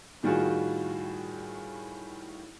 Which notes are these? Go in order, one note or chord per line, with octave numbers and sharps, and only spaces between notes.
A2 D#3 G3 F4 F#4 G#4